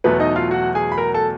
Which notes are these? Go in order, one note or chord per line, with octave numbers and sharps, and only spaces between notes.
E2 B2 F#3 A3 B3 B4
D#4 D#5
F4 F5
F#4 F#5
G#4 G#5
B5
A#4 A#5
A4 A5